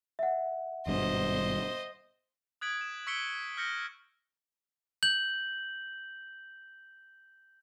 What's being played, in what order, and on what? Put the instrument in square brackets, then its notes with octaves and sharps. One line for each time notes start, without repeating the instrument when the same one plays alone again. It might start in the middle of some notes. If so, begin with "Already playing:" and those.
[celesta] E5 F#5
[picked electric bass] G#1 G2 B2 [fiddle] C5 D#5
[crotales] D#6 F#6 G#6 B6 D7 F#7
E7
C#6 E6 B6 C#7 D7 G7
F6 G6 A#6 C#7 G7
[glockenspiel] G6 F#7